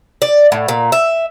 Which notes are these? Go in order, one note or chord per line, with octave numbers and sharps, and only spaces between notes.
D5
A2
A#2
E5